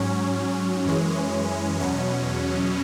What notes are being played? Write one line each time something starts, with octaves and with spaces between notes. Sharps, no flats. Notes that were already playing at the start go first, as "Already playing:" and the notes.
Already playing: G#2 F#3 C#4
F#2 E3 G#3
E2 B2 F#3 C#4